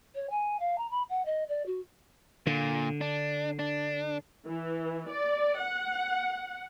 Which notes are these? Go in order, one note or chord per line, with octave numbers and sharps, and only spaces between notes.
C#5
G#5
F5
A#5
B5
F#5
D#5
D5
F#4
A#2 D3
D4
D4
E3
D5
F#5